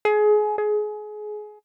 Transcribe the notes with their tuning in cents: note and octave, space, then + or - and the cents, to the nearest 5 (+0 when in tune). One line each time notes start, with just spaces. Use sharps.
G#4 +25
G#4 +25